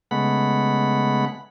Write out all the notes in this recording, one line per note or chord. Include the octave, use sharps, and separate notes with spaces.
C#3 G#3 A3 B3 F#5 B5